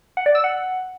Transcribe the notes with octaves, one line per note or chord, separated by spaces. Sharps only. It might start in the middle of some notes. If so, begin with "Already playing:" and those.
F#5
D5
E6
F#5